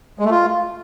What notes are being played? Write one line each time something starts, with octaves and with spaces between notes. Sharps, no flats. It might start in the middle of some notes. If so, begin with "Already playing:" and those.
G#3
A3
F4